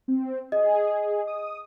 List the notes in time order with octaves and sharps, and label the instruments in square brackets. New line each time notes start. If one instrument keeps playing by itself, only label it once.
[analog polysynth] C4
[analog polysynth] G#4 [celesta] D#5
[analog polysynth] D#6